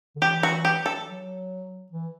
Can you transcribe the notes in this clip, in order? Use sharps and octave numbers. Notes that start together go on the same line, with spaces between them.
D3
E3 G4
F#4
G4
A4
F#3
E3